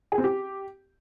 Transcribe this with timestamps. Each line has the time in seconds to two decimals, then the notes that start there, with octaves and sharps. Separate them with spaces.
0.12 G#4
0.18 C4
0.24 G4